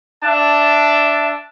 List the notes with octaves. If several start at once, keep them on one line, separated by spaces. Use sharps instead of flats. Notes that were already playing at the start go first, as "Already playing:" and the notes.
D4 E5 A5